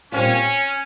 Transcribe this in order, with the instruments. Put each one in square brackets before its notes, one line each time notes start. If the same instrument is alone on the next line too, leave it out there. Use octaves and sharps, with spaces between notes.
[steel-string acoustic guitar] A#2 G3 C4 F4 [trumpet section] C#4